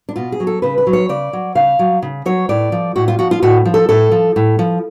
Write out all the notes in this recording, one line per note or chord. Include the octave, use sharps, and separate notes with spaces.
D4
B2 F4
G#4
F#3
A4
C#3 B4
B4
F#3
C#5
C#3 D5
F#3
C#3 F5
F#3
C#3
F#3 C#5
A2 D5
F3
A2 F#4
F4
F3 F#4
F4
A2 F#4
F3
A4
A2 A4
F3
A2
F3